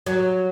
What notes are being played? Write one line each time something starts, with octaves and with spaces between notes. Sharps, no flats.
F#3